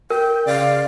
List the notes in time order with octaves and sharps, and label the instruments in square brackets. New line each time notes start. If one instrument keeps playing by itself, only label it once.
[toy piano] A#4 [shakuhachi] G5
[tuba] C#3 [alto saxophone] D5 [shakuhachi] F5